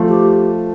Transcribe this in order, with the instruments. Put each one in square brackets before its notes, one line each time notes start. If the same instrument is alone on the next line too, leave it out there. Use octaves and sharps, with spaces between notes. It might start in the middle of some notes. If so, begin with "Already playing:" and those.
Already playing: [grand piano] F3 A3
[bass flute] G4